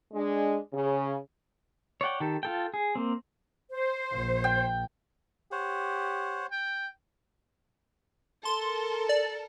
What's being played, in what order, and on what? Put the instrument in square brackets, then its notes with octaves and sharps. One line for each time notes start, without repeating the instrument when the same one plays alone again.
[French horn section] G#3 D4
C#3
[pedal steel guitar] C#5 D5 F#5 G5
D#3 G4 A4
F4 A4 G5
G#4
A#3 C4
[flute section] C5
[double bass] A#1
[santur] G5
[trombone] G4 [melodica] C5 C#5 F#5
[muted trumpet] G5
[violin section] A4 A#4 [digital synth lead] C6
[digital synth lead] D5